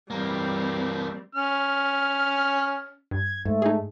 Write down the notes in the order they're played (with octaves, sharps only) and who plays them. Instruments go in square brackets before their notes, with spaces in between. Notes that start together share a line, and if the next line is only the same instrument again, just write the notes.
[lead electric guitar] E3 A#3 [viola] G3 C4
[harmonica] C#4 F6
[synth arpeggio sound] G2 [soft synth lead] G#6
[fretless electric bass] G#2 [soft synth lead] A3
[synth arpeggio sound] D#4 G#4